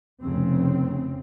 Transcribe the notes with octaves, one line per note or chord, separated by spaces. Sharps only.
F1 C#3 C4